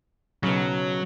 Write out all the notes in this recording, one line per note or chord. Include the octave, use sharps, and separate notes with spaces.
B1 C#3 F#3